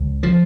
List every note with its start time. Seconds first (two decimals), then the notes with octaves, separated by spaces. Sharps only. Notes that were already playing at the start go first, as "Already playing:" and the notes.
Already playing: C#2
0.23 F3